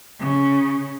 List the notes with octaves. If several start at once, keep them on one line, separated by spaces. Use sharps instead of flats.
C#3